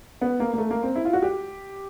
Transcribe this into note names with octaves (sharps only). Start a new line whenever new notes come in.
B3
A#3
A#3
A3
A#3
C4
E4
F4
F#4
G4